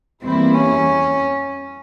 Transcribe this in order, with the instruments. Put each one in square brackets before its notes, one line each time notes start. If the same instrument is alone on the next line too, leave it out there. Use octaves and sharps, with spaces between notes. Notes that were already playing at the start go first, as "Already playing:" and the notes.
[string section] E2 E3 G3 A#3 E4 [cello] C4
[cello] C#4